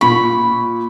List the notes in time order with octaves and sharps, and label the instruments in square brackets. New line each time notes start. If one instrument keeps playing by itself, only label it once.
[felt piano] A#2 C#6 [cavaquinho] B5